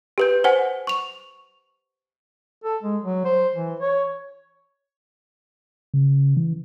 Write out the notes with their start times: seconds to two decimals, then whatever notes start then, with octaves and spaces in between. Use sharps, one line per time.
0.18 G4 B4 G6
0.44 C5 F#5 G#5
0.87 C#6 F7
2.64 A4
2.83 G#3
3.03 F#3
3.25 C5
3.55 E3
3.80 C#5
5.94 C#3
6.37 E3